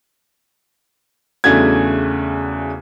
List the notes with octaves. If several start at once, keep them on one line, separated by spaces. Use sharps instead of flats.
E2 C#3 A3 D4 F#4 G#6